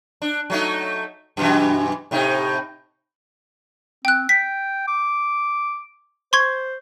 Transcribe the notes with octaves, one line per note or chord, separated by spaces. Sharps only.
D4
F#3 A3 D#4
F#2 B2 E3
A2 C3 D#4
C4 G5 F#6
G5 B6
D6
C5 C6 C#6 G#6